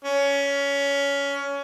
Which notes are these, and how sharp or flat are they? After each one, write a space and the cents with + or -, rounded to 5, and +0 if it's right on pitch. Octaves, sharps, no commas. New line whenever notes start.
C#4 +20